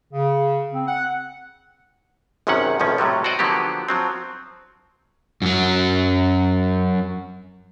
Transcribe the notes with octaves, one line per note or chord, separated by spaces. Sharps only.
C#3
C4
F#5
G#1 F#2 C3 D#3 C#4 F#5
B1 A2 D#3 F3 C#4
A2 C3 F#3 G3
F#4 C5 D5 D#5
D3 F3 F#3 A#3 B3 G4
F3 F#3 C4
F#2 F#3